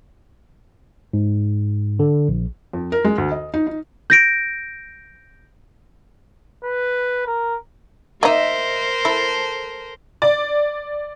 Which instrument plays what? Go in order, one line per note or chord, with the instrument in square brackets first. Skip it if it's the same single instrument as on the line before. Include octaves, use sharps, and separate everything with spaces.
[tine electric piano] G#2
D3
A#1
[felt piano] F2
A#4
G#3
D2
D#5
D#4
D#4
[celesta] G6 A#6 D7
[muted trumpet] B4
A#4
[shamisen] A#3 D#4 [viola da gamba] A#4 C5 [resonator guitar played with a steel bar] D#5 E5
[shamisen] E4 [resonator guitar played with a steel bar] A4
[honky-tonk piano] D5